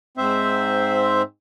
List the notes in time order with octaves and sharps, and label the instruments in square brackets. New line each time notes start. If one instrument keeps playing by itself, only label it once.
[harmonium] G#2 C4 C5 E5